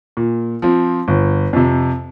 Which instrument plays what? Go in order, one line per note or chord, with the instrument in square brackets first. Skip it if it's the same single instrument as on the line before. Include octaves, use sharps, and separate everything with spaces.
[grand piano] A#2
F3 C4
G1
F2 C3